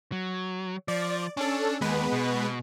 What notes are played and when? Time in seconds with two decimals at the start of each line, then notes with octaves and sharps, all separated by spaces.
0.12 F#3
0.88 F3 D5
1.37 C#4 D4 A4
1.81 D#2 G#3 B3 B4
2.13 B2